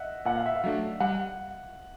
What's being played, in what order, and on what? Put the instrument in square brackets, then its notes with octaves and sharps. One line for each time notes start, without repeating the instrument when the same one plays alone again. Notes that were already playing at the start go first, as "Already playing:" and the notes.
Already playing: [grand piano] D#5 E5 F#5
[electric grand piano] A#2 [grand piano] F#5
[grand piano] F5
E5
F5
[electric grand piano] F#3 A3 D4
[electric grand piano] G3 [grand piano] F#5